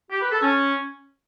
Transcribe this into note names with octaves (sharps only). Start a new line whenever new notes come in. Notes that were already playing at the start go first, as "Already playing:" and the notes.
G4
B4
A4
C#4